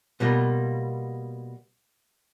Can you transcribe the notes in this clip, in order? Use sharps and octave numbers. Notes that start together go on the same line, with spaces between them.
B2 G3 A#3 F4